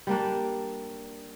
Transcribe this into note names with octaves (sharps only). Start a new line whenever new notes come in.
G3 A#3 D4